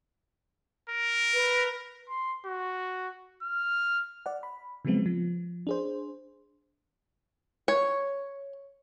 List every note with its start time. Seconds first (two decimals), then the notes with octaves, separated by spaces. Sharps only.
0.90 A#4
1.34 B4
2.08 C6
2.46 F#4
3.43 F6
4.26 D5 F#5
4.43 B5
4.85 C#3 F3 F#3 G#3 B3 C4
5.06 F3
5.67 D4 G#4 C5
7.68 C#5